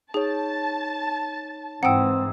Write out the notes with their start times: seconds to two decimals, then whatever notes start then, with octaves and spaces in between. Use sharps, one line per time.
0.14 D#4 G#4 C#5 A5
1.83 G#2 E3 C4 F#5 G5 A#5 D#6 E6